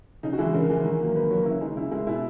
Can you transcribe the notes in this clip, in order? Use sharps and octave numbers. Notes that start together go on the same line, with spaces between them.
C#3 D#4
F#4
E3 G#3 E4
C#3 A#4
E3 G#3
D#3
F#3 A#3
D#3 B4
F#3 A#3 F#4
C#3 E4
G#3 D#4
C#3 E4
G#3 E4
B2 E4